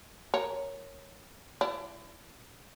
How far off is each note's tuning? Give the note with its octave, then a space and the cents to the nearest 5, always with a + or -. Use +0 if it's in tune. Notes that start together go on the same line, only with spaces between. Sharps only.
A#4 +0 C#5 +0
E4 +35 D5 +0